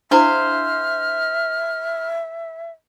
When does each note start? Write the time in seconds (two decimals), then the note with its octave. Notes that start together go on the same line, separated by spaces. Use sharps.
0.11 D4 E4 G#4 C5 E5 F5 F6